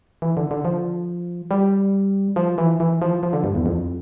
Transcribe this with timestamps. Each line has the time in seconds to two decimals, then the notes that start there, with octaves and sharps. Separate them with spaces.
0.22 E3
0.37 D3
0.51 D3
0.65 F3
1.51 G3
2.36 F3
2.58 E3
2.80 E3
3.02 F3
3.23 F3
3.33 D3
3.44 G2
3.55 E2
3.66 F2